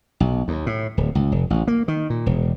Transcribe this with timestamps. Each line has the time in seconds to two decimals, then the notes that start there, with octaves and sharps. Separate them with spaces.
0.20 B1
0.48 D#2
0.66 A2
0.97 D1
1.15 C#2
1.32 F1
1.50 A1
1.68 A#3
1.88 D#3
2.10 A#2
2.26 E1